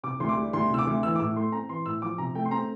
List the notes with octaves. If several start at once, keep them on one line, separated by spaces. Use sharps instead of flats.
C3 D6
D2 C6
D6
G3
D2 C6
C3 E6
D6
D2
E3 E6
D6
A2 E6
A3 C6
C4 A#5
E3 C6
A2 E6
F3 D6
C3 A#5
A3 G5
C6
C4 A#5